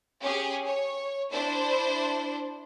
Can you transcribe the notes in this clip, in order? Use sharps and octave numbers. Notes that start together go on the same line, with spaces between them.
C#4 G4 G#4
C#5
D4 E4 C5